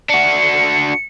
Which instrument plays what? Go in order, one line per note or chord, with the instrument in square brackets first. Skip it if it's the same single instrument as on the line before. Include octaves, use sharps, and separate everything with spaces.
[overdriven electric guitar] D4 F#4 [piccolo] C#7